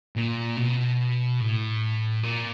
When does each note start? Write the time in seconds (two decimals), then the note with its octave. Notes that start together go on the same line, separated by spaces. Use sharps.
0.16 A#2
0.57 B2
1.41 A2
2.23 A#2